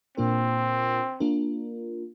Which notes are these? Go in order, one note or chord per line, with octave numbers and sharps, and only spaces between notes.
A#2 A#3 C4 D4 F4 A#4
A#3 D4 F4 A#4